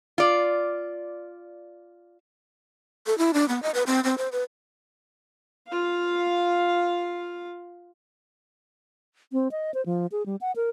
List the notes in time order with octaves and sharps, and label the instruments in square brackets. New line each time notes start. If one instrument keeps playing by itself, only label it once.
[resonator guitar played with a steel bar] F4 D5
[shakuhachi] A4
E4
D4
B3
D#5
B4
C4
C4
C5
B4
[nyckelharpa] F4 F5
[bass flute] C4
D#5
C5
F3
G#4
G3
F#5
A#4